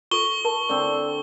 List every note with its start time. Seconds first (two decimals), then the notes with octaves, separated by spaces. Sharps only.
0.11 F4 A4 C#6 G7
0.45 A#4 A5
0.69 D3 C4